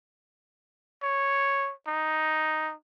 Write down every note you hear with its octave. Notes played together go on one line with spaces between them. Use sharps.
C#5
D#4